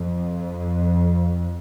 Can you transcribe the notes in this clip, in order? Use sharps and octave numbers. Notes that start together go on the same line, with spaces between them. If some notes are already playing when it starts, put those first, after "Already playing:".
Already playing: F2